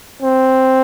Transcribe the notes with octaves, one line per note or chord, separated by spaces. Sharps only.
C4